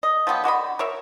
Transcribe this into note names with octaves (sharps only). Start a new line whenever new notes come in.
D#5
F3 F#3 B3 G4
D3 F#4 D#5 B5
A#4 C#5 E5